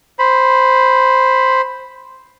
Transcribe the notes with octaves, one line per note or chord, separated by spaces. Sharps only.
C5 B5